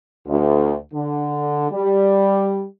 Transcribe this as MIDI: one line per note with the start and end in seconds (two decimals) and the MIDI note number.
0.27 0.74 38
0.93 1.66 50
1.71 2.64 55